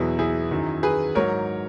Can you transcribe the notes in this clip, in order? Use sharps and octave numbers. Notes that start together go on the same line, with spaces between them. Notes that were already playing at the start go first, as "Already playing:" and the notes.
Already playing: E2 B2 F#3 E4 G#4
E4 G#4
F#2 D#3 F#3
G#4 B4
G#2 F#3 A#4 C#5